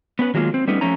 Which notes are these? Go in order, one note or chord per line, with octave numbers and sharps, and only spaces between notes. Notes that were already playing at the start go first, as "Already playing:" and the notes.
B3 C#4 B4
D#3 F#3 G#3 A#3 F4
C4
G3 A3 B3 C#4 D#4
F3 A3 C#4 A#5